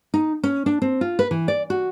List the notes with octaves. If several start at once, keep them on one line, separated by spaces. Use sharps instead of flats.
D#4
C#4
D4
C4
F4
B4
E3
D5
F#4